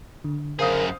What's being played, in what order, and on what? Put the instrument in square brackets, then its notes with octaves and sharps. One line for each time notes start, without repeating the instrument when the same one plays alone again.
[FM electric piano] D3
[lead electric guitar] F#2 G#4 [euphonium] A#4 [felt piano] C5 F5 D#6